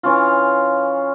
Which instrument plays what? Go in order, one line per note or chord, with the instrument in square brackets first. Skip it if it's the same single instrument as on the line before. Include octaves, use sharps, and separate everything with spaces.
[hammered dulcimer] E3 C#4 F4